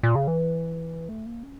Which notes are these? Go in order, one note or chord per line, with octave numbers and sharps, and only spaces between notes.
A#2
C#3
E3
A3
A#3
C#4